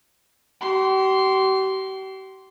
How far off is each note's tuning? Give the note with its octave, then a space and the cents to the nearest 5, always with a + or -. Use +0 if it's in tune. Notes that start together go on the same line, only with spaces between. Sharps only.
G4 -40 C6 +0